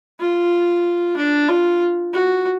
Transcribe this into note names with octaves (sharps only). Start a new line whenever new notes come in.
F4
D4
F4
F#4